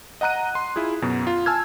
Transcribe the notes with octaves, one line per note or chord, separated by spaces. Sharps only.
D#5 F#5 A#5 F#6 D#7
C6
E4 F4 G#4
F#2 B2
F4
G#5 A5 E6 F6 G#6